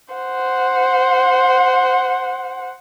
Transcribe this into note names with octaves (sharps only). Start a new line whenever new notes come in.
C5 F#5